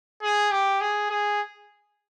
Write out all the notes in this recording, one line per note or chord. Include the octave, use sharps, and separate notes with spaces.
G#4
G4
G#4
G#4